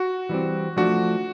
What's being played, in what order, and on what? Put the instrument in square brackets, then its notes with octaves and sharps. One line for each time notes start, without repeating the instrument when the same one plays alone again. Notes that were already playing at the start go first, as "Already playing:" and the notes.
Already playing: [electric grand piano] F#4
[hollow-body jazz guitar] E3 G3 C4
[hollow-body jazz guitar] F3 A3 D4 [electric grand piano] F#4